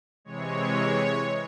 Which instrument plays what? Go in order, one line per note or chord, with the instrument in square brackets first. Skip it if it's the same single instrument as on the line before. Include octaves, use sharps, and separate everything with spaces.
[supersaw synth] C3 E3 G#3 C#5